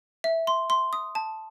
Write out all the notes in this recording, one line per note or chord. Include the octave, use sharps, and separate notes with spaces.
E5
C6
C6
D#6
A5